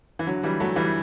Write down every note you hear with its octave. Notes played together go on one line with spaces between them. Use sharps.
E3
D3 F#3
E3 G3
F#3 A3
E3 G3